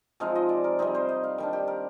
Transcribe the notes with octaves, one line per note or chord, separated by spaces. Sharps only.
C3 F3 G#3 D#4 F5
D#5
D5
A#4
C3 G3 C4 D#4 G#4
C5
D#5
F5
D#3 G3 D4
G4
A#4